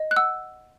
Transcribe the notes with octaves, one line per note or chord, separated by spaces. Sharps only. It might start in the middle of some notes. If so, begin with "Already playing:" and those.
Already playing: D#5
F#6
F#5 E6